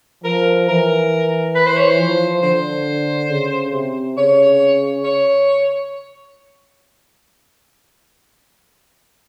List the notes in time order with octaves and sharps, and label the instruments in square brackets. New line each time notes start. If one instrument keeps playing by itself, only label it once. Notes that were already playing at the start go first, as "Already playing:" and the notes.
[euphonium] F3 [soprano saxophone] A#4
[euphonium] E3 [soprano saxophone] A#4
[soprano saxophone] B4
C5
C#5
C5
[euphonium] F3
[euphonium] D3 [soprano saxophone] C5
[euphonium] C#3
C3
[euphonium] C#3 [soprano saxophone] C#5
[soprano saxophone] C#5